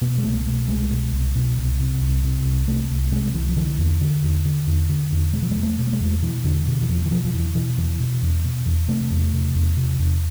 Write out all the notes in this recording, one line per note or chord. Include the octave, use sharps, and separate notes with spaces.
B2 B3
G#3
C2 A3
B2 A3
C2 G#3
B2
C2
B2
C2
C3
C2
C3
C2
C3 A3
C2
C3 G#3
C2 E3
F3
D3 E3
E2
D3
E2
D3
E2
D3
E2
B2 G#3
F3
G#3
E2
A3
B2
A3
G#3
E2
B2 E3
E2 D3
B2
E3
E2 F3
E3
B2 F3
F3
E2 E3
B2 E3
E2 E3
B2
E2
B2
E2
C3 A3
E2
C3
E2
C3
E2